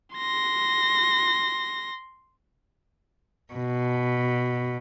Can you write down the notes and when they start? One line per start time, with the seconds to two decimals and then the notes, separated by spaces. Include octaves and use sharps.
0.16 C6 A#6
3.53 B2